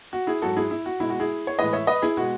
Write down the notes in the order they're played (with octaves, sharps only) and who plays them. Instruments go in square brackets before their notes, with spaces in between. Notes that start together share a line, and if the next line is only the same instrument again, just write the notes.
[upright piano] F#4
E4 G#4
G#2 F#3 F#4 A4
E4 G#4
E4
F#4
B2 G#3 E4
F#4
E4 G#4
C#5
A2 E3 G#3 B4 D#5
C#5 E5
B4 D#5
E4 G#4
B2 G#3 F#4